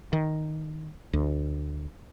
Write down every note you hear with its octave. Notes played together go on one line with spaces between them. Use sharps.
D#3
D2